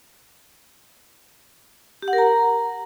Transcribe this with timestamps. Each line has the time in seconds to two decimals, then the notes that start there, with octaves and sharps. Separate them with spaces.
2.03 G4
2.08 F#5
2.13 A#4
2.18 A#5